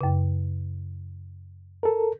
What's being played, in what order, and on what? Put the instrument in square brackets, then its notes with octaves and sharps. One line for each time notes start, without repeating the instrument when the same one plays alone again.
[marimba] F#2 C#3
[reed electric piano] A4 A#4